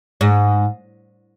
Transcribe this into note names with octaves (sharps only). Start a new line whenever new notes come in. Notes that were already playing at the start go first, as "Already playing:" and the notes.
G#2